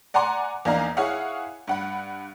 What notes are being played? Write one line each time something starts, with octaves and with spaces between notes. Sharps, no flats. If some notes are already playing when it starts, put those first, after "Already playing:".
D5 F#5 G#5 A#5 C6 D6
E2 A#3 D4 D#4 F5 A#5
E4 G#4 C#5 F5 F#5
G2 F#5 B5